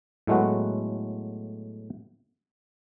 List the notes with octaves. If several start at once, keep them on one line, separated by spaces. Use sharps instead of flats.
A2 F#3 G#3 A3 B3 F#4